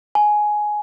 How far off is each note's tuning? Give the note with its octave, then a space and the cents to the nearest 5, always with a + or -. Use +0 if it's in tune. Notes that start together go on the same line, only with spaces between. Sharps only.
G#5 +10